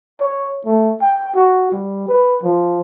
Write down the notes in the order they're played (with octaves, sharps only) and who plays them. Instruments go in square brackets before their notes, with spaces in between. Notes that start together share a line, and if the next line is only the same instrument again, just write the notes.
[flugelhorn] C#5
A3
G5
F#4
G3
B4
F3